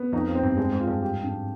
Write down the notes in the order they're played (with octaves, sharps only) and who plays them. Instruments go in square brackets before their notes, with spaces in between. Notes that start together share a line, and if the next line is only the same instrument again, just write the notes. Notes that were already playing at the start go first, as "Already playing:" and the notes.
Already playing: [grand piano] B3
[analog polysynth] F2 [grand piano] D#4
[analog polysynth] F2
[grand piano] C4
[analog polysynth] G2
[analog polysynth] G2 [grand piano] G#3
[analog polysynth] G#2
[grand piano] F4
[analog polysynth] G2
[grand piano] G4
D4